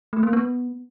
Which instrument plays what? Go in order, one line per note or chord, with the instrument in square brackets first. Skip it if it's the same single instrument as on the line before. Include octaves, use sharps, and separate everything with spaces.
[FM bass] A3
A#3
B3